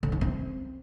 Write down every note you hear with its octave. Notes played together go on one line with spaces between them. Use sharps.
D3
D#4
C4